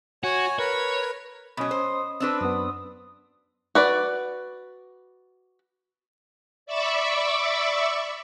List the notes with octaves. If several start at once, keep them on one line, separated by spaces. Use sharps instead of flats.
F#4 C#5 G#5
A#4 B4 C#5
B2 F#3 C#4 D#5 B5 D#6
C5
C4 D4 B4 E6
F#2 B3 D#6
F#4 B4 D5
D5 E5 B5 C#6 D6 E6